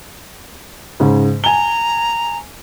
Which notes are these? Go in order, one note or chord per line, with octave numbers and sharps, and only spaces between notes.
G#2 C#3
G#5 A#5 G7